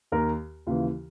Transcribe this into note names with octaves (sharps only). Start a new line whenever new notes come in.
D#2 D#3 A#4
D#2 C#3 E3 F4